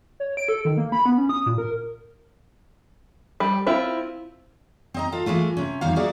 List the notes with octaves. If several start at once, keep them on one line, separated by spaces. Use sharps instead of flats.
C#5
D7
A4
D#3
A#3
B5
B3
C#4
D#6
A#2
A#4
G3
C4 E4 F4
C4 D#5 A#5
F4 A4
E3 G#3 A3 F4
C3 C#4
E2 D#3 G3 C#4 F#4 F5
A#3 F#4 G#4 D5 E5